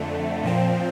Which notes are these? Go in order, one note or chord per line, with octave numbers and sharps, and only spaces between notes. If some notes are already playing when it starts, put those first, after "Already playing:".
Already playing: F2 D3 A3
A#2 F3 C4